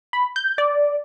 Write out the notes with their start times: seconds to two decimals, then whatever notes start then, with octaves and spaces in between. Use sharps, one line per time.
0.13 B5
0.36 G6
0.58 D5